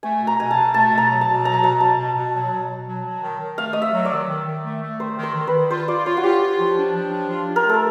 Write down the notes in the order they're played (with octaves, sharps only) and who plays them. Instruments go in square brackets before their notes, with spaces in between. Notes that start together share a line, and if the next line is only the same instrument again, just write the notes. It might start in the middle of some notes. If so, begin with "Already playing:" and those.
[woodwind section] A3 [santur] G#5
[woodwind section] B2
[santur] A#5
[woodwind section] B2 [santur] G#5
[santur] A5
[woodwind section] B2
[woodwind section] A3 [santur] A5
[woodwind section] B2
[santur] A#5
[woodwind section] F#3
[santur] A5
[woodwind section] B2
[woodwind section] F#3 [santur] A#5
[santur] A5
[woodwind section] B2 [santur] A#5
[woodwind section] B2 [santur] A5
[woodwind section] B2
B2
F#3
B2
B2
F#3
F#3
D#3
D#3
[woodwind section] A3 [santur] F5
[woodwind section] A3 [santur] D#5
[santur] E5
[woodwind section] F#3
[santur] D5
[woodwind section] D#3
D#3
D#3
A3
A3
[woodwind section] D#3 [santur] C5
[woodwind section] D#3
[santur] C5
[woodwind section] D#3
[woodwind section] D#3 [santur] B4
[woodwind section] F4 [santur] C5
[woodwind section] F4 [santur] D5
[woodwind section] F4 [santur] C#5
[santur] F#4
[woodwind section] F4 [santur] G4
[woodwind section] F4
F3
D4
F3
D4
F4
F4
[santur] A#4
[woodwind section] A3 [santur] A4